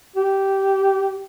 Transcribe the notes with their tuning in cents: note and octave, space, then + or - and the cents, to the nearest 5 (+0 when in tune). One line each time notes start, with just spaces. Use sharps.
G4 -15